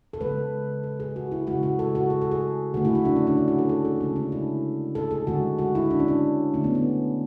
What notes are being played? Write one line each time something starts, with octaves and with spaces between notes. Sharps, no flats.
A4
C#3 G#3 B4
A4
G#4
F#4
E4
C#3 G#3 F#4
F#4
A4
F#4
G#4
A4
G#4
D3 A3 F#4
E4
F#4
D4
C#4
D4
E4
F#4
A4
A4
G#4
C#3 G#3 C#4
D4
E4
A4
G#4
D3 G#3 F#4
F#4
E4
D4
C#4
D4
D3 A3 C#4
B3
B3